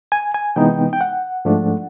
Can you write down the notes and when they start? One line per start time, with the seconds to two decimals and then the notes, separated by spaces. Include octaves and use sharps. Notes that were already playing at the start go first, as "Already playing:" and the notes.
0.12 G#5
0.34 G#5
0.56 C3 E3 G#3 B3 D#4 G5
0.93 G5
1.01 F#5
1.45 G#2 F3 A3 D4